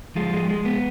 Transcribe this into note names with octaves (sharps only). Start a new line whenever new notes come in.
F3 G#3 F4
G#3
G#3
B3